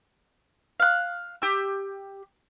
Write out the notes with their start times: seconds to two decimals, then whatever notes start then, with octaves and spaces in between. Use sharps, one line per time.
0.80 F5 F#6
1.42 G4 E6